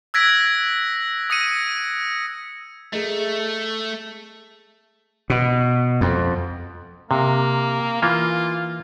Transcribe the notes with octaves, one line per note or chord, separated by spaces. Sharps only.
E6 F#6 G#6 A#6 B6 D7
D#6 A#6 C#7 D#7
A3 G#4 A#4 D#5
B2
F2
C3 A#3
E3 A#3 F4